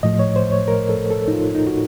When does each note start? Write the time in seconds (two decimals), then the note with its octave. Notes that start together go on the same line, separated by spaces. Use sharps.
0.03 A2 F3 A3 D#5
0.19 C#5
0.36 C5
0.52 C#5
0.68 A#4
0.89 A4
1.10 A4
1.28 D#4
1.33 F4
1.55 D#4
1.67 F#4